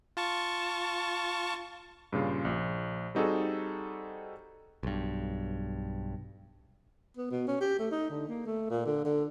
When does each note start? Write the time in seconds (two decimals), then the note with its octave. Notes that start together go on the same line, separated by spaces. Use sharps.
0.17 F4 A5 C#6
2.13 G2 A#2 C#3 F4
2.45 A#1
3.15 G3 C4 D#4 F#4 G#4 A4
4.83 B1 G2
7.17 B3
7.31 B2
7.47 C#4
7.60 G4
7.79 A3
7.91 D#4
8.10 D3
8.28 A#3
8.46 A3
8.70 A#2
8.86 D3
9.05 D3